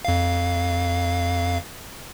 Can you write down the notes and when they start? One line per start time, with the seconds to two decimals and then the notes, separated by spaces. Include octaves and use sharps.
0.05 F2 F5